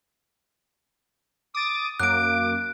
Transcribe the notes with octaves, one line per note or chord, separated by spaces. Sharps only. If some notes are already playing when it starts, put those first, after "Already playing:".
D6 D#6 A6
F#2 A#3 D6 F#6 D7